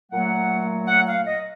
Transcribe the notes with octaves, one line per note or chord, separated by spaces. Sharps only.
A#2 F#3 A3 F#5
F#5
F5
D#5